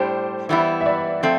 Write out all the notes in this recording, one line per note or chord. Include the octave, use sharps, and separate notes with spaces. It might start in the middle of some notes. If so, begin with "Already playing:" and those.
Already playing: A2 G3 D4 G4 C5
E3 G3 B3 E4
E5
D5
F3 A3 C4